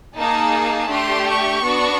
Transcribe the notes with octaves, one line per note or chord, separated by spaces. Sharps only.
A#3 D#4 G#4 A5
A3 D4 G4 C6
C#6
B3 D4 F#4